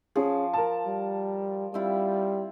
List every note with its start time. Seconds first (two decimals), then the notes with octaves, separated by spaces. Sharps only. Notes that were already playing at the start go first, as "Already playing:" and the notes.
0.16 F3 C#4 G#4
0.54 A#4 A5
0.86 G3
1.74 G3 C4 E4 F4